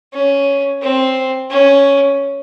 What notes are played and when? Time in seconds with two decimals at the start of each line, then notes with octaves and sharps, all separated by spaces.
0.13 C#4
0.82 C4
1.50 C#4